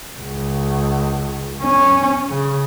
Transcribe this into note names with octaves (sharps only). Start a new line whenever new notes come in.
C#2
C#4
C#3